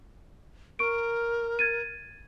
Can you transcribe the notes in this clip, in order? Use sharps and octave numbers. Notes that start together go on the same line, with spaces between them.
A#4 C#6 D7
G#6 A6 D#7